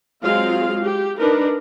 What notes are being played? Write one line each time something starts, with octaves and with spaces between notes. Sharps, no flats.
F#3 G#3 C4 F4 F5
G4
D4 D#4 A#4 B4